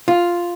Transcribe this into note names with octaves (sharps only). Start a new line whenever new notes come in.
F4